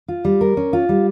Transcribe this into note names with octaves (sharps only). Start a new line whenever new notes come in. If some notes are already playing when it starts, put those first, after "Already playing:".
F4
G3
A#4
C#4
F4
G3